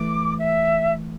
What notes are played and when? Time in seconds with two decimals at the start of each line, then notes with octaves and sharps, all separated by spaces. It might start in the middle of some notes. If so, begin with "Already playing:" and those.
Already playing: E3 A3 D6
0.39 E5